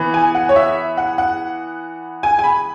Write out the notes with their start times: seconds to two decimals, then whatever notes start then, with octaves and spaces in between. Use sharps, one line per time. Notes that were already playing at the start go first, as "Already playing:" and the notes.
Already playing: E3 B3
0.14 G#5
0.35 F#5
0.49 C#5
0.56 E5
0.97 F#5
1.18 F#5
2.23 G#5
2.39 G#5
2.43 B5